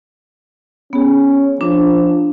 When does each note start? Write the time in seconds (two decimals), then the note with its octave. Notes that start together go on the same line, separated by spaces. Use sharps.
0.93 B3 C#4 G#4
1.61 F3 D4